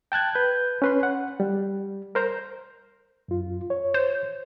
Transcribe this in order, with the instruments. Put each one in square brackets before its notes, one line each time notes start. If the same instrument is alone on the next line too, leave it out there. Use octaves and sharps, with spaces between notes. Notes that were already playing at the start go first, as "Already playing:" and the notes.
[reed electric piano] G5 A5 F#6 G#6
B4 G6
C#4 B4 C6
F#5
G3
A#4 C5 A#5
F#2 F4
C#5
[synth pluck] C5